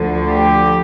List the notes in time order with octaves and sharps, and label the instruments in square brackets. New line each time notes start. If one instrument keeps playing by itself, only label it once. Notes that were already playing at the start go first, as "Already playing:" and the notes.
Already playing: [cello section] D2 D3 F3
G4